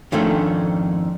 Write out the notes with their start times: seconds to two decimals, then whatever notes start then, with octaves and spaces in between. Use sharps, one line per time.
0.12 F2 G#2 D#3 A3 C#4 D4